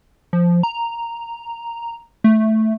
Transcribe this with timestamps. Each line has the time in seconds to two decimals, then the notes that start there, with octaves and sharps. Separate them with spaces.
0.33 F3
0.63 A#5
2.24 A3